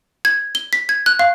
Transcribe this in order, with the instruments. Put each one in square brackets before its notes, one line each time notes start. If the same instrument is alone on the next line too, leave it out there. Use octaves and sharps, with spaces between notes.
[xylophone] G#6
G7
B6
G#6
F#6
F5